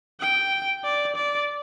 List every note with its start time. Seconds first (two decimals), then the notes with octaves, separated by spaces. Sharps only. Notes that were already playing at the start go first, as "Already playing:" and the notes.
0.20 G5
0.84 D5
1.16 D5